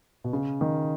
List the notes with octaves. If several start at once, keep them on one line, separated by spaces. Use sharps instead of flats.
B2
C#3
D#3